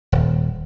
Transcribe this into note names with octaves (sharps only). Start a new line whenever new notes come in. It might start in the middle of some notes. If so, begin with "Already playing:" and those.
D#1